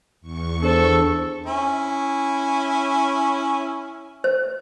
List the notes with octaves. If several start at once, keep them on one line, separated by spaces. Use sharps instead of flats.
E2 C#6
D4 G#4 A4 C5
C#4 E4
C5